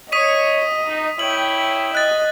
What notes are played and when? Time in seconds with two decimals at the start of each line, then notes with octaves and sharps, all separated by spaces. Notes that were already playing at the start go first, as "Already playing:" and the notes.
0.12 C#5 D#5 D#6 B6 D#7
0.86 D#4
1.19 E4 C#5 G5 F#7
1.95 D#5 F#6 A6